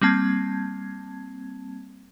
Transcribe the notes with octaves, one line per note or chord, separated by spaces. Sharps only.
G3 A#3 C4 A5 G#6